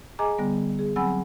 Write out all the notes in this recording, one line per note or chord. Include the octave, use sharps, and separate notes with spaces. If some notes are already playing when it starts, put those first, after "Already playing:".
G#4 D#5 G#5 A#5 D6
D3 G3 B3
G#4
F#3 C4 F#5 G#5 B5 E6